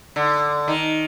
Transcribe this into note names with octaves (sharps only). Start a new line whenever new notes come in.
D3
D#3